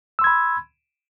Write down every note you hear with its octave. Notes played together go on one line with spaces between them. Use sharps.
B5 C6 E6 G#6